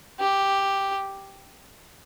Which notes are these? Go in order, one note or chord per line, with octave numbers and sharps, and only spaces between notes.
G4